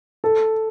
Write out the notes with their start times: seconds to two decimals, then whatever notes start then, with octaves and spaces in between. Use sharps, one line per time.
0.24 A4